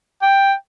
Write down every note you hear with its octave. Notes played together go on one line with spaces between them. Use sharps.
G5